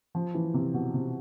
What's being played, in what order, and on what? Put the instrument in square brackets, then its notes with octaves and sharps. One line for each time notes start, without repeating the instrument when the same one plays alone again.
[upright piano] F3
E3
C3
B2
C3